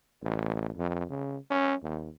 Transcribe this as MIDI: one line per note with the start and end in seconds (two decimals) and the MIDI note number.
0.22 0.70 33
0.76 1.04 41
1.09 1.37 49
1.50 1.75 61
1.83 2.10 39